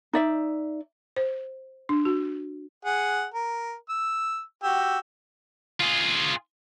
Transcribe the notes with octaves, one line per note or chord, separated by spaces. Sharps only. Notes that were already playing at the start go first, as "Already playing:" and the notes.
D#4 D5 E5
C5
D4
F#4
G#4 F#5
A#4
E6
F#4 G4 E6
F4 G#4